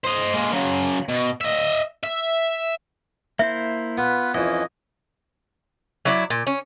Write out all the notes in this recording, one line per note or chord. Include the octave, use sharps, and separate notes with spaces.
C5 D#5
G#3 A#3
C#3 F#3
B2
D#5 E5
E5
A#3 E4 C5 E5
B3 F4 B4
F2 E3 C#4 D#5
F#3 E4 D5
A#2
C#4